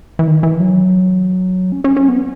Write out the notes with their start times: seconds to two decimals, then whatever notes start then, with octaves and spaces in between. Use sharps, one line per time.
0.19 E3
0.27 D#3
0.43 E3
0.60 F#3
1.72 C#4
1.84 C#4
1.97 C#4
2.08 B3